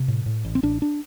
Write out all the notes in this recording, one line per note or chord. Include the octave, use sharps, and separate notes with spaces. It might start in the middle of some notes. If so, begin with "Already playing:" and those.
Already playing: C3
A2
A2
A1
C4
A1 D4
D4